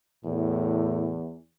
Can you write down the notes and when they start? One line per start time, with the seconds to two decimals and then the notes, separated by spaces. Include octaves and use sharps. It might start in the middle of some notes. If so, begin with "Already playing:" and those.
0.25 E2 A2